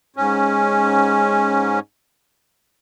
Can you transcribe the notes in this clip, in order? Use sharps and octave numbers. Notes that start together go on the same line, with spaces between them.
G#2 C#4